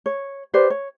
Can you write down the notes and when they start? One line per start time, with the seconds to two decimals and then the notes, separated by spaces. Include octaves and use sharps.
0.06 C#5
0.54 G4 B4 C5 D5
0.70 C#5